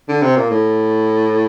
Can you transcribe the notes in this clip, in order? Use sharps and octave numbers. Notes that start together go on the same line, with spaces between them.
D3
C3
A#2
A2